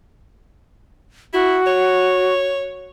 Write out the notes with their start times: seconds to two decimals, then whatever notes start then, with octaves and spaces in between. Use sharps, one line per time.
1.33 E4 F#4
1.67 C#5